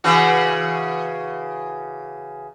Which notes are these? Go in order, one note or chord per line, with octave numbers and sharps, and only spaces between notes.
C#3 E3 F#4